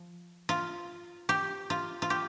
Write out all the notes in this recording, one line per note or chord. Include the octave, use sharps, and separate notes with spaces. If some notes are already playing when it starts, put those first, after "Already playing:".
Already playing: F3
F4
G4
F4
F4
G4